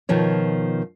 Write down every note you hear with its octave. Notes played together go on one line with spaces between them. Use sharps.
B2 D#3 F3 C#5